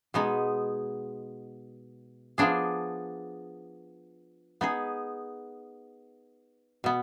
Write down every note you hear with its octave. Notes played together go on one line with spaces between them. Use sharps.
B2 G#3 B3 D#4
F3 B3 D4 G#4
B3 D#4 G#4
B2 B3